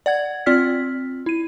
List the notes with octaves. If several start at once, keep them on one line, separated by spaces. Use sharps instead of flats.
D5 F#5 G#6
C4 F4 D5 F6 B6
E4 D#7